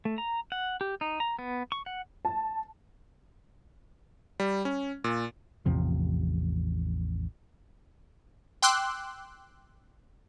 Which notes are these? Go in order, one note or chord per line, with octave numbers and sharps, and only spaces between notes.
A3
A#5
F#5
G4
D#4
A#5
B3
C#6
F#5
A5
G3
C#4
A#2
A1 E2 C3 F3
G5 C6 D6 E6 F#6